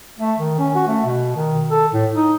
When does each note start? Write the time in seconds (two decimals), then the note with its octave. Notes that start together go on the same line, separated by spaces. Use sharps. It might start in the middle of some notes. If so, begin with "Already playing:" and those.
0.19 A3
0.39 D#3
0.59 C#4
0.75 F#4
0.87 A3
1.05 B2
1.36 D#3
1.71 A4
1.93 A2
2.14 D#4